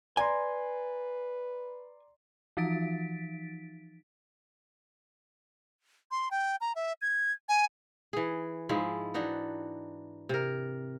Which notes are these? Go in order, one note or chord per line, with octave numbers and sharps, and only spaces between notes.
B4 D5 G#5 A#5 C6
E3 F3 D#4 A6 B6 D7
C6
G5
A#5
E5
G#6
G#5
E3 G#4
G#2 F3 G#3 E4
E3 D4 D#4 F#4
C3 A#4